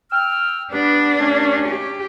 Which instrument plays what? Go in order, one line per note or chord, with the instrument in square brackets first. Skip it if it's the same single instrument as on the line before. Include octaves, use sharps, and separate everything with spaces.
[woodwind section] G5 E6 F6
[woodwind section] B3 G4 B4 [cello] D4
[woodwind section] D#2 A3 C#4
[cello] G4